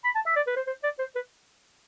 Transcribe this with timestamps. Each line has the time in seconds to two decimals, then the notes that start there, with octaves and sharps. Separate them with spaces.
0.04 B5
0.15 A5
0.26 E5
0.36 D5
0.47 B4
0.56 C5
0.67 C5
0.83 D5
0.99 C5
1.15 B4